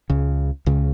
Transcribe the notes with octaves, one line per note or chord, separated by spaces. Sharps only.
C#2 C#3
C#2 C#3